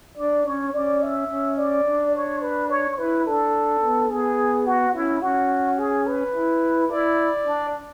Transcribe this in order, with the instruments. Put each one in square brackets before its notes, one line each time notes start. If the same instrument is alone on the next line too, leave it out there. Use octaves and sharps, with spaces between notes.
[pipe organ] D4 [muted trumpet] D5
[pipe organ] C#4 [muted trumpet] C#5
[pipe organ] C#4 [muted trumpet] D5
[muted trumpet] E5
[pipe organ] C#4
[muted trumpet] D5
[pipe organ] D4
[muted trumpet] C#5
B4
C#5
[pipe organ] E4 [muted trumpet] B4
[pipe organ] D4 [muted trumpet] A4
[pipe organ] B3
[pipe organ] B3 [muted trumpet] G#4
[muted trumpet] F#4
[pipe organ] C#4 [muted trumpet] E4
[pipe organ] C#4 [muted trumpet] F#4
[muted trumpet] G#4
B4
[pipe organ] E4
[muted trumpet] E4 [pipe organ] D5
[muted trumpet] D4